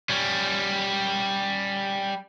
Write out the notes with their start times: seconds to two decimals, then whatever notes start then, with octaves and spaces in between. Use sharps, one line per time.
0.09 G3 C#4